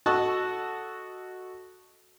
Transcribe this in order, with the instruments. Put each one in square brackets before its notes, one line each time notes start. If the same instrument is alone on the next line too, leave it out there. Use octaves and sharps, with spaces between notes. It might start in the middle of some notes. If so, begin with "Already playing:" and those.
[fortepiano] F#4 A4 D#5 A5 C#6 F#6